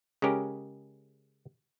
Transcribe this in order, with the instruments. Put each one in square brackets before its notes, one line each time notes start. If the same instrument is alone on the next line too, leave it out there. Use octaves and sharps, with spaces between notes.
[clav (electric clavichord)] C#3 G#3 C#4 G4 A#4